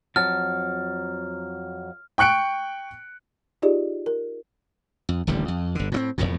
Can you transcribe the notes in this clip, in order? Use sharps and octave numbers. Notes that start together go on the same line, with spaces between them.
F2 F#3 A5 F6
G5 C#6 F#6 C#7 D7
D#4 F4 G4 G#4 D5 D#5
A#4
F2
D#1 A1 D3 G3
F2
G1 D3
A2 F3 C4
E1 A#1 F2 A2